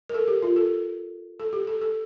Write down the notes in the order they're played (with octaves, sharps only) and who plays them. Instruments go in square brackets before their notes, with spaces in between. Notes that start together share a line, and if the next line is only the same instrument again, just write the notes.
[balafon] A#4
A4
G4
F4
A4
A4
G4
A4
A4